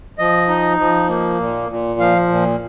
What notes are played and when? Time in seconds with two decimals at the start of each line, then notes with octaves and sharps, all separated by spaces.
0.19 F3 D#5
0.49 D#4
0.79 F3
1.09 A#3
1.39 A#2
1.69 A#2
2.00 F3 F5
2.30 A#2